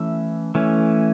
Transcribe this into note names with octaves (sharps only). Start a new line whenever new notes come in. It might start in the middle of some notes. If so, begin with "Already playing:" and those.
Already playing: E3 A3 C#4 E5
E3 A3 C#4